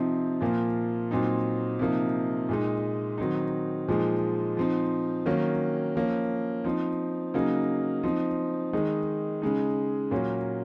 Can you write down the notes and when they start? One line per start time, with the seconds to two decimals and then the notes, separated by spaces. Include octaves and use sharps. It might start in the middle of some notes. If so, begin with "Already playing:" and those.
Already playing: C3 F3 C4 D#4
0.41 A#2 F3 A#3
1.11 A#2 F#3 C4 D#4
1.79 C3 F3 A#3 D#4
2.49 A#2 G#3 D#4
3.18 D#3 F#3 C4 D#4
3.88 A#2 F3 G#3 D#4
4.57 F3 C4 D#4
5.26 D#3 F#3 A#3 C#4
5.95 F3 A#3 C#4
6.64 F3 C4 D#4
7.34 C#3 F#3 A#3 D#4
8.03 F3 C4 D#4
8.73 D#3 G#3 D#4
9.42 C#3 G#3 D#4
10.11 A#2 F#3 A#3 C#4